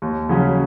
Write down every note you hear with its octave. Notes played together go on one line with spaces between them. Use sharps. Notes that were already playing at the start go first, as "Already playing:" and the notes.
D#2
C#3 F#3 C#4